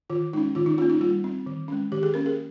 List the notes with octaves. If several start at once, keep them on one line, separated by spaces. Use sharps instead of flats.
D#3 F4
G#3 C#4 D#4
D#3 F4
D#4
A#3 C#4 F4
D#4
G3 F4
C4
D#3
G#3 C#4
D#3 G4
G#4
A#3 C#4 A#4
G#4